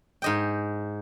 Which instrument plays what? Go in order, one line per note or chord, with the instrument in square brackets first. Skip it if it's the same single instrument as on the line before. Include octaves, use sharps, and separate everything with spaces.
[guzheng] G#2 D#5 G5